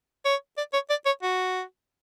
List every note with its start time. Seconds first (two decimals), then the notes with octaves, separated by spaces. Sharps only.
0.25 C#5
0.57 D5
0.73 C#5
0.90 D5
1.06 C#5
1.23 F#4